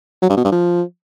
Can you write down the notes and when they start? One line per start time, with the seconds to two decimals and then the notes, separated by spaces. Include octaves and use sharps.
0.22 F#3
0.30 G2
0.37 B2
0.44 G2
0.52 F3